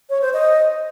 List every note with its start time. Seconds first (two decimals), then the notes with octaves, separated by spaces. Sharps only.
0.10 C#5
0.22 C5
0.33 D#5